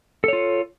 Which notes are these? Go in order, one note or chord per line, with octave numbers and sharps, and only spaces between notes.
F4 A4 C#5